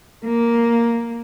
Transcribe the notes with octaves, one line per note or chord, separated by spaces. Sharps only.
A#3